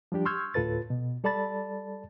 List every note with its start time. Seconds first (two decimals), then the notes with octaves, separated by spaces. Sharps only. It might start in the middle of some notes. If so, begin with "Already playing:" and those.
0.12 F3 G3 D4 G4
0.26 C6 C#6 E6 F6 G6 G#6
0.54 D2 A2 F4 A4 B4 A6
0.90 B2
1.24 G3 A4 D5 A5 B5 A6